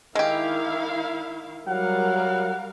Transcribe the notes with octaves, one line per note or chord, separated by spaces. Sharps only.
D#3 G#3 E4 G4 F5
F#3 G3 A#4 F5 F#5